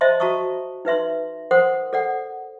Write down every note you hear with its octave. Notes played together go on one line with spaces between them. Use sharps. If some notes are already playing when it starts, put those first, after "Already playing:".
C5 D#5 E5 A5 C6
F#4 A5 A#5 C#6 D#6
D#4 B4 E5 C6
A#4 C5 F#5 C6 D#6
A4 D5 F#5